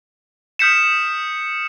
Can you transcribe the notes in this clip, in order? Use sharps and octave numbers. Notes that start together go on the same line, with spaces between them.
D#6 F6 G6 B6 C#7 E7